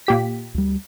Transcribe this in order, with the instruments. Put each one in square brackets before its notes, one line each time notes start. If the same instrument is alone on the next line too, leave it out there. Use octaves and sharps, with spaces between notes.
[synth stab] A#2 G4 B6
[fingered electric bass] D2 G3